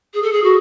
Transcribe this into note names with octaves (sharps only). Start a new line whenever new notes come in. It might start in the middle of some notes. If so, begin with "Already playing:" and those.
G#4
A4
G#4
F#4